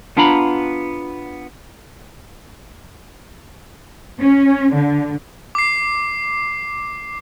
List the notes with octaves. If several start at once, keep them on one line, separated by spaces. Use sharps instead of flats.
B3 D4 F4 A#5 B5
C#4
D3
D6 C7